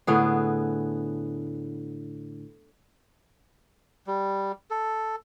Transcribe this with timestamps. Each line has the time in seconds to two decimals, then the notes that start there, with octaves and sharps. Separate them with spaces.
0.07 A2 D3 B3 G#4
4.07 G3
4.71 A4